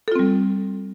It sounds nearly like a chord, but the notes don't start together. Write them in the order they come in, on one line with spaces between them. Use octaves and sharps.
A4 F4 C4 G3